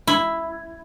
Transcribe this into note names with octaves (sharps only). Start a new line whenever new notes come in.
E4